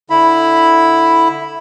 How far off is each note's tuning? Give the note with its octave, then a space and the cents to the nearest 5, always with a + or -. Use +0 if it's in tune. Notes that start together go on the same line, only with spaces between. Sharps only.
D3 +0 E4 +0 B5 +0